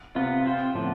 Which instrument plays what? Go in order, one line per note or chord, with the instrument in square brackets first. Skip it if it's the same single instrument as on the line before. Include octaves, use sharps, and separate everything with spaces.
[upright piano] C3 [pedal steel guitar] B3 F4 B4
[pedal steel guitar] C4 F4 C5
[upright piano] A2 [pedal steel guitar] D3 F3 B3